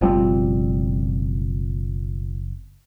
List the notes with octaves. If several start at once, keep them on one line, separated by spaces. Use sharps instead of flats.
F#1 B2 F3 G3 C4